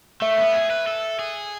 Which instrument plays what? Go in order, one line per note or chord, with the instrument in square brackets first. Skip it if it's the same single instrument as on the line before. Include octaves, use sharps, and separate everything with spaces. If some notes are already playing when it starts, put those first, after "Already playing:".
[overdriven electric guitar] A3 [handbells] E5
[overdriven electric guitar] B3
G#4
B4
A4
G#4